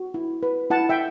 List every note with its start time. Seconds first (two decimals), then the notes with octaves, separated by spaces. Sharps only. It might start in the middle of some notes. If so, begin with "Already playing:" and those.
Already playing: F#4
0.14 E4
0.43 B4
0.70 E4 F#5 A5
0.89 E5 G5